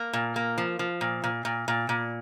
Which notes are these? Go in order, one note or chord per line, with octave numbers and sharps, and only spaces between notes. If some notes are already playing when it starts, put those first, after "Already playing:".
Already playing: A#3
A#2
A#3
F3
F3
A#2
A#2
A#2
A#2
A#2